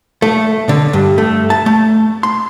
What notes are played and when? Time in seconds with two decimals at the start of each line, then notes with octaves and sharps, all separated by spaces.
0.22 A3
0.69 D3
0.93 G2
1.18 A3
1.50 A5
1.66 A3
2.23 C6